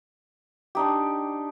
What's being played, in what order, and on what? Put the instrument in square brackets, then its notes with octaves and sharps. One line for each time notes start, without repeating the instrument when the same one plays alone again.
[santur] D4 D#4 G4